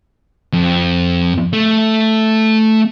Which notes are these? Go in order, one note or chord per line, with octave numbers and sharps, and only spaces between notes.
F2
A3